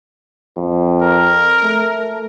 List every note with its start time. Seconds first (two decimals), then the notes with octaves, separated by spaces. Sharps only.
0.57 F2
1.02 A#4
1.63 A3